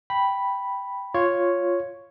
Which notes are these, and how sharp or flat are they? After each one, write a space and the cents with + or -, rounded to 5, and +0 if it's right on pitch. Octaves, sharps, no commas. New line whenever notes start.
G5 +0 B5 -5
F4 +0 C#5 +0